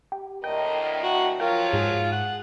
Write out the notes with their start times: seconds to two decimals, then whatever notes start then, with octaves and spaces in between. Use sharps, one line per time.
0.12 G4
0.44 D2 A2 A#4 D#5 G5
1.03 F#4
1.40 F3 F#3 F4 A#4 C#5 G5
1.73 G#2 G#4
2.12 F#5